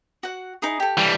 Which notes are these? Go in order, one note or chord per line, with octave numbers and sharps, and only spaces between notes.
F#4 F#5
D#4 E4 G#4
G4 A4
E3 G3